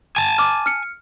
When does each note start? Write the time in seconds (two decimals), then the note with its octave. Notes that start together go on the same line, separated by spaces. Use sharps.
0.16 G#5 A5
0.38 D6 F6
0.66 F6 C#7